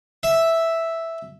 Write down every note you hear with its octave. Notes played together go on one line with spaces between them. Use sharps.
E5